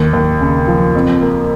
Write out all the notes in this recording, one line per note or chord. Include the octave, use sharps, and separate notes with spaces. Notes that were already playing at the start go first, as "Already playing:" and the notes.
Already playing: D#2
D#2
C#3
F3
F2
A#3